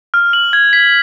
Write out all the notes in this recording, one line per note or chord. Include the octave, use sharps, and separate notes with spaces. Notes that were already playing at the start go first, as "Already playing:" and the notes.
F6
F#7
G#6
B6